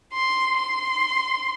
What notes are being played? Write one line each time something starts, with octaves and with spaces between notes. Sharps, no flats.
C6
C6